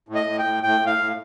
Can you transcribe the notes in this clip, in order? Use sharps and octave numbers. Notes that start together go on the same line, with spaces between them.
A2
D#5
A2
G5
A2
A2 G5
A2 F5
A2